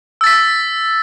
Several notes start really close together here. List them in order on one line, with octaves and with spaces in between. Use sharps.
E6 A6 B6